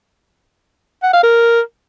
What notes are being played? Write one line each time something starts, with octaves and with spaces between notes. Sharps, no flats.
F#5
F5
A#4